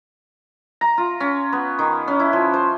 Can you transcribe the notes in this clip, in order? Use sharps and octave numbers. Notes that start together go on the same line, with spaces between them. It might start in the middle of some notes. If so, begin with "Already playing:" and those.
A#5
F4
C#4
B3
D#3
C#4
E4
F3
C5